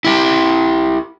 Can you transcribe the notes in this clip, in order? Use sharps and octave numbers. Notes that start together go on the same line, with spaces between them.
E4 G4